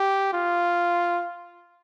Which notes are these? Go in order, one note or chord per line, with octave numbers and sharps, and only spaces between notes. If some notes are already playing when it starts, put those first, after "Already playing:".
Already playing: G4
F4